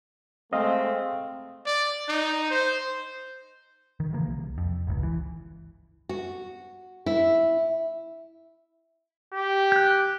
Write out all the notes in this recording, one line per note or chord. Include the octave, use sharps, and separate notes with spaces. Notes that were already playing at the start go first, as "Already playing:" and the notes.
G#3 A3 C4 D#5 F5
D5
D#4
C5
D#3
C#3 E3 F3 A#3
C2
F2
G1 C#2
E3
F#4
E4
G4
F#6 G6